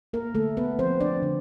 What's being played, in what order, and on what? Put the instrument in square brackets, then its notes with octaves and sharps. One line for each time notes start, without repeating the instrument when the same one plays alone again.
[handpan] A#3 A#4
D3 A3 A4
B3 B4
F3 A3 C4 C5
D4 D5
D3